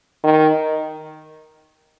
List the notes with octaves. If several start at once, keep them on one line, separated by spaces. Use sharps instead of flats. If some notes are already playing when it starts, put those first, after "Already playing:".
D#3